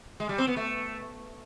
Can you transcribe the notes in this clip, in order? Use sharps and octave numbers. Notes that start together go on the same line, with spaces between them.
G#3
G3
C4
B3
A3